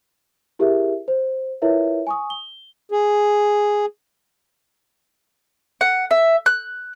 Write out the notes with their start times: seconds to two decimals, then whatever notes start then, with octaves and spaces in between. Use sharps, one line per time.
0.59 E4 G4 G#4 A#4 E5
1.08 C5
1.62 E4 F4 A#4 B4 C#5 E5
2.07 G#5 C#6 D#6
2.30 G7
2.92 G#4
5.81 F#5
6.11 E5
6.46 F#6